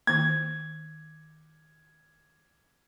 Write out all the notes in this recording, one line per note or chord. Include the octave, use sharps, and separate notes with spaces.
D#3 A#3 G#6